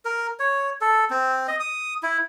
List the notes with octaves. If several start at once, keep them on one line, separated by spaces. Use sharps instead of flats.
A#4
C#5
A4
C4
D#5
D#6
E4